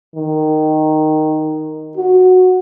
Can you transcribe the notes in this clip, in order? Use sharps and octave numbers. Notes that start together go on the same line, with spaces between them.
D#3
F#4